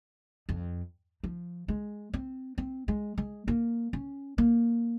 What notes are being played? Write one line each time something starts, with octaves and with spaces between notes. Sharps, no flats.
F2
F3
G#3
C4
C4
G#3
G#3
A#3
C#4
A#3